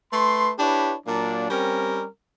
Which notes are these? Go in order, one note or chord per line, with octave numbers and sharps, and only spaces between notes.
A3 B4 C6
D4 E4 G4 B4 C#5
A#2 F#3 A#3 D4
G3 C4 C#4 A#4